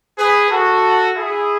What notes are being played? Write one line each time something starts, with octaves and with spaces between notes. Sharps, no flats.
G#4 B4
F#4 A4
E4 G#4